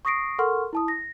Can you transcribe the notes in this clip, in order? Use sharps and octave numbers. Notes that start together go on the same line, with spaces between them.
C#6 D#6 A#6 C7 D7
A4 A#4 F#5 C6 C#6 F6
E4 A5 D#6
A#6